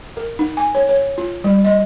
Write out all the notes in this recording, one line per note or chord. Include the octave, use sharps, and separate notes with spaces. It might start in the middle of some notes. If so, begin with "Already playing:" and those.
A#4
D#4
G#5
C#5
C#5
F4
G3
D#5